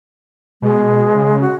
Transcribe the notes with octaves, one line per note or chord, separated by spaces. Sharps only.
B2 G#3
C#3
F#4